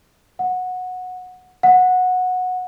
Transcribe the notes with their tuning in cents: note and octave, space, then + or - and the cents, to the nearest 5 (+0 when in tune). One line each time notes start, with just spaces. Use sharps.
F#5 -15
F#5 -15